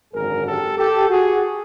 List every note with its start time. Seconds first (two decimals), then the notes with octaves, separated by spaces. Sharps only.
0.13 G#1 F#2 D3 G#4 A#4
0.45 G4 A4
0.77 G4 A4
1.09 F#4 G#4